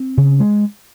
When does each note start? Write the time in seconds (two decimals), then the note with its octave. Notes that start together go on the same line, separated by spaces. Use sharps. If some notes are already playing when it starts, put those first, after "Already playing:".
Already playing: C4
0.17 C#3
0.40 G#3